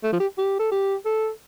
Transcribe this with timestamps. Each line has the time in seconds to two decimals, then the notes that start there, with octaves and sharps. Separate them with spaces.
0.04 A3
0.13 F3
0.20 G4
0.38 G4
0.59 A4
0.72 G4
1.05 A4